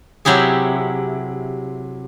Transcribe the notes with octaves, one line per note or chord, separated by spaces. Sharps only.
C3 F#3 E4 G4 G#4